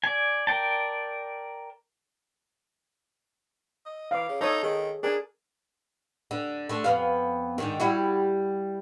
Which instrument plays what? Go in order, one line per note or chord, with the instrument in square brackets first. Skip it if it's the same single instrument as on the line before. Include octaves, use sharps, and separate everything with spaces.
[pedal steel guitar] D5 G#5
A#4 D5 G5 A5
[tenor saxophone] D#5
[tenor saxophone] E3 [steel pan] F5 D6
[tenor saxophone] C#3
[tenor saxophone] D#4 [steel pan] A4 C#5 D#6
[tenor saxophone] D#3 [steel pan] G#4
[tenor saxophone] D4 [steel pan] G#4 A#4 G#5
[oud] D3
D3 A3
F2 B3 F5
G#2 D3 D#3
G3 E4 F#4